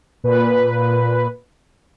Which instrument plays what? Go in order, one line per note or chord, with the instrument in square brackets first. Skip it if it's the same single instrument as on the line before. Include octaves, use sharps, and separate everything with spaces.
[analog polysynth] A#2 B4